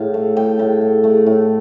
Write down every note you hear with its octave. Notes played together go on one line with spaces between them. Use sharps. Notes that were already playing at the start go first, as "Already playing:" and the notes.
Already playing: A2 F5
A3
A2 G5
A2
A3
A3
A2